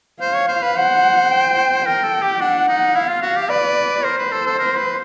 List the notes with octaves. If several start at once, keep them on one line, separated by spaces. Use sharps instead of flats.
C5 F5
C#5
C5
B4
C5 F#5
G5
A#4 G5
A4
G4
D4 F#5
D#4
E4 F5
F4
F#4
G4
B4 D5
A#4 C5
B4
A4
A4
A#4
B4